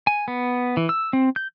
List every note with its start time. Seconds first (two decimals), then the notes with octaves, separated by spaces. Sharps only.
0.07 G#5
0.28 B3
0.77 E3
0.89 E6
1.13 C4
1.36 G6